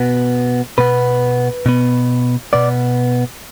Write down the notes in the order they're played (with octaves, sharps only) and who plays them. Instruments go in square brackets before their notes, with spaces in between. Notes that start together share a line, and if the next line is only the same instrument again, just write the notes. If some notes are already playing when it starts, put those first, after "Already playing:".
Already playing: [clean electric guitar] B2 B3
B2 B3 B4
B2 B3
B2 B3 D5